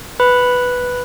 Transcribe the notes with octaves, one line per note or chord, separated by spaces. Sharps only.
B4 B5